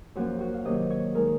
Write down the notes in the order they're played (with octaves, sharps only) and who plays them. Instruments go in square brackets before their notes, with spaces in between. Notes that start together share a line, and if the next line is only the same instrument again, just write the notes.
[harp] F#2 F3 A#3 C#4 F#4
F#4
F5
C3 D#3 F#3 A#3 D#5
C#5
D#3 G#3 D#4 A#4